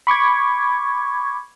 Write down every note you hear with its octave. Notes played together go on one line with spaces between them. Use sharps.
B5 C#6 D6 G#6